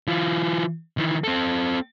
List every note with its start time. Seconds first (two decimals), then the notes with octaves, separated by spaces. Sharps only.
0.07 E3 F4
0.98 D#3 E3
1.24 C4 A4